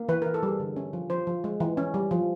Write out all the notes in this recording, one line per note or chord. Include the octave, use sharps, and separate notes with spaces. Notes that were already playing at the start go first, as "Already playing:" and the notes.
Already playing: A#3
E3 B4
A#4
E3
A4
G3 G#4
D3
C#4
F3
F3 C5
F3
G#3
E3
C#4
G3
F3